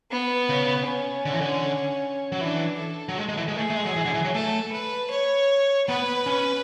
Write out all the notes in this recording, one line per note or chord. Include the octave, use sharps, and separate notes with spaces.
B3
C#3
C#4
D3
E3
D3
F#3
E3 D4
A4
F#3
G#3
G#3
E3
G#3
A3 G#4
A3
G#3
F#3
E3
D3
E3
F#3
A3 A4
B4
C#5
B3 B4
C#4